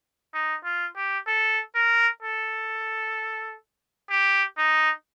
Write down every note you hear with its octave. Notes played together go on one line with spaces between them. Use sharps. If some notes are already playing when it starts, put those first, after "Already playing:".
D#4
F4
G4
A4
A#4
A4
G4
D#4